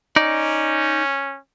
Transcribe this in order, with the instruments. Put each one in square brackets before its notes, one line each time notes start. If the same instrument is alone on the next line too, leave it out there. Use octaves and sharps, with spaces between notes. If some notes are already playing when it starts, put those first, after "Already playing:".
[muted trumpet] C#4 [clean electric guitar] D#4 D5